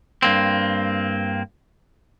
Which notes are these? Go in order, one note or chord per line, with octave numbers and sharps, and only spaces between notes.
G2 A#3 C4